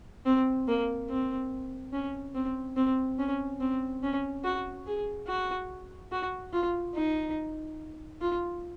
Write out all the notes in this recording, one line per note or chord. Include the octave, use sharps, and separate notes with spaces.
C4
A#3
C4
C#4
C4
C4
C#4
C4
C#4
F#4
G#4
F#4
F#4
F4
D#4
F4